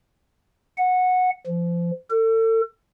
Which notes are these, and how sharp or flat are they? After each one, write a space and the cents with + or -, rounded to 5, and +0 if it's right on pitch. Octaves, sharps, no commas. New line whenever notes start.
F#5 -15
F3 -30
A4 +35